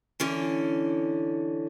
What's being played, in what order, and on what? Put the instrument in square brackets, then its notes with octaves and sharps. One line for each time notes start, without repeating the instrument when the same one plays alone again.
[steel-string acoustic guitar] D3 E3 C#4